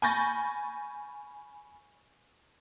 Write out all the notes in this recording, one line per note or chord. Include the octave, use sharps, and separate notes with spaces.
G#5 B5 C#6 G6 A6 A#6